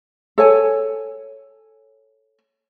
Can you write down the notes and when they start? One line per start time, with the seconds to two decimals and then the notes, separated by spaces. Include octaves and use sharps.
0.38 A4 C#5 G#5